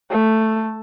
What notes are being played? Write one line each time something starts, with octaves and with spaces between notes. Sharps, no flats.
A3